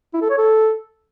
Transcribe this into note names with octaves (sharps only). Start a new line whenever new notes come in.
E4
A4
C#5
A4